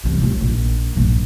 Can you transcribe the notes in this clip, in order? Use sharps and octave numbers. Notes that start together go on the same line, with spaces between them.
C2 E3
D#2 F4
A#1
A#1 G2